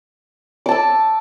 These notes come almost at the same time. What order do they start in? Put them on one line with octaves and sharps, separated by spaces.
D6 A5 E6